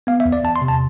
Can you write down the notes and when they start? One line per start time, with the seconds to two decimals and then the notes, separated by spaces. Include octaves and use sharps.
0.07 B3 F5
0.20 E5
0.26 E2
0.32 D5
0.44 E2 A5
0.56 C6
0.62 C3
0.68 A5